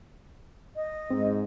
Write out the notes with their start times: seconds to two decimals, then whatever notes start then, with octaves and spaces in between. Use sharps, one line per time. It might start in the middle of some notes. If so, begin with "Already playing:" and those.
0.76 D#5
1.11 G#2 C4